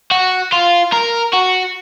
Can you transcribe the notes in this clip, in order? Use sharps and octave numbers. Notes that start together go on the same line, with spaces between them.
F#4
F4
A#4
F#4